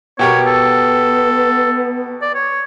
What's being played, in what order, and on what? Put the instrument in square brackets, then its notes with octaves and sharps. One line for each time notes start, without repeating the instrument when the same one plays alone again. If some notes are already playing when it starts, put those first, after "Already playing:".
[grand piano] B2 G4 A#4 [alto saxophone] B3 [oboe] C#5
[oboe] A4
D5
C#5